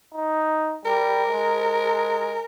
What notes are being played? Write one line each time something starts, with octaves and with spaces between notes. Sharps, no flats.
D#4
G3 A#4
G#3